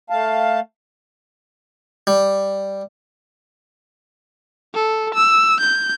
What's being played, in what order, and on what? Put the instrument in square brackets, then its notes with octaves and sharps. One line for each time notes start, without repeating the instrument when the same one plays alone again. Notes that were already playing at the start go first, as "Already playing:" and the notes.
[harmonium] A3 F5 A5
[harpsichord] G3
[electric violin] A4
E6
G6